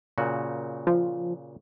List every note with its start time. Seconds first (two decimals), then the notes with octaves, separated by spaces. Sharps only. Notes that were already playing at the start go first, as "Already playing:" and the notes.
0.18 A#2 C#3 F#4
0.87 F3